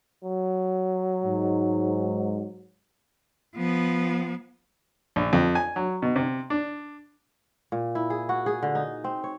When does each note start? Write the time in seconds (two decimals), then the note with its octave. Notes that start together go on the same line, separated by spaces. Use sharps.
0.24 F#3
1.24 G#2
3.55 F3 B3
5.16 A#1
5.33 F2
5.55 G#5
5.76 F#3
6.02 B2
6.16 C3
6.50 D4
7.72 A#2
7.95 E4
8.10 G#4
8.29 F#4
8.46 G#4
8.62 D3
8.75 D#4
9.04 C4
9.24 C#5